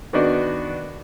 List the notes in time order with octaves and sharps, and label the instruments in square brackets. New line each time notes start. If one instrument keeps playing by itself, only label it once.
[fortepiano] D#3 B3 D4 F#4 D5 D#5